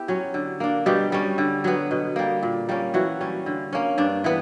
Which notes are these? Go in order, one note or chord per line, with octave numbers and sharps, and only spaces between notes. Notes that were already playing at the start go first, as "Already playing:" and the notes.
Already playing: B3 E4 G4
F#3 C#4
D3
A#3 D4
B2 G3 G4
G3 C#4
D3
F#3 B3
B2
G3 A#3
A#2
G3 A#3 C#4
E3 F#3 F#4
G3 C#4
D3
A#3 C#4
G2 D4
E3 B3